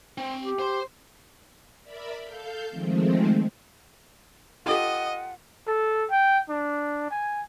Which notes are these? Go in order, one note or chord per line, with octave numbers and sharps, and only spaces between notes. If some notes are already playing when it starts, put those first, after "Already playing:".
C4
G4
C5 C6
A#4 D5 E5 B5
A4 F5 G6
D#3 F3 G#3 A3 C4
F4 G4 A4 D#5 F#5
A4
G5
D4
G#5